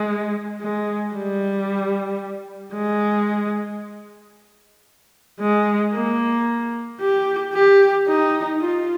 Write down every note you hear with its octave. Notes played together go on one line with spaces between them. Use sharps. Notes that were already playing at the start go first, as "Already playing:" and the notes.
Already playing: G#3
G#3
G3
G#3
G#3
A#3
G4
G4
D#4
F4